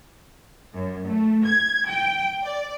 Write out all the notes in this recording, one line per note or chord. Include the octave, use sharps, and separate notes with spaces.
F#2
A3
G#6
G5
D5